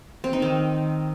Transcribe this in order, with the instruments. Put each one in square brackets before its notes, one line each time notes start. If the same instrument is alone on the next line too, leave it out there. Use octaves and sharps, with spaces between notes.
[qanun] C4
D#4
D#3